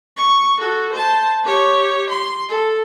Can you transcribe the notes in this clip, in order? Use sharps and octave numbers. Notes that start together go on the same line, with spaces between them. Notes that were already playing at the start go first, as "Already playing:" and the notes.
C#6
F#4 A4
C5 A5
G4 C#5
C6
A4